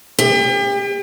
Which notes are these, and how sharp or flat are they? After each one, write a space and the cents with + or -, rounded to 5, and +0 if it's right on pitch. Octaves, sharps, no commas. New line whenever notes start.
G4 +40